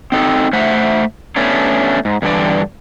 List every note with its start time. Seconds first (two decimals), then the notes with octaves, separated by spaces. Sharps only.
0.12 C4 D#4 A4
0.53 A3 C5 E5 F#5
1.36 A3 B3 C#4 D4
2.05 G#2
2.22 E2 G2 D3 E3 D5